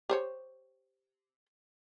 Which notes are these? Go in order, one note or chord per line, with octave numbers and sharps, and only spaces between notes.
G4 C5 C#5